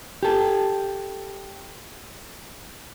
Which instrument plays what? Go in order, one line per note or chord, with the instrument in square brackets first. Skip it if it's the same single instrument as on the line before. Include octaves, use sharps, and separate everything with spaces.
[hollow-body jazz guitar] G4 A4